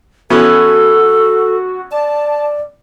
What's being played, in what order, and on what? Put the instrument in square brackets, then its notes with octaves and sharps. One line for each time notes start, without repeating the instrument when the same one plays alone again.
[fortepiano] E3 B3 C#4 [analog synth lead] F#4 [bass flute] A4
[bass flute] D5 [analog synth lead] A5